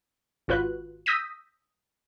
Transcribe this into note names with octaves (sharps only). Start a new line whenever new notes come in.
G#1 F4 F#4 B4 F#6
D#6 E6 G6 A#6 B6 D#7